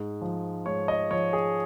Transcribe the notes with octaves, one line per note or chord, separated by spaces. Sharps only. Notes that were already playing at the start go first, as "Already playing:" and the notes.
Already playing: G#2
F3
G#2 C#5
D#5
F3 C#5
G#4